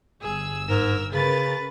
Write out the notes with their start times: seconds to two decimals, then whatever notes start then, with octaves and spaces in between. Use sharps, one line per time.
0.22 G1 G#4 E6
0.69 G#2 A#4
1.13 C#3 C#4 A#4 B4 A6